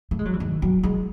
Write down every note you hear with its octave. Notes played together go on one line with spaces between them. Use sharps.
A3
G#3
F#3
E3
D#3
F#3
G#3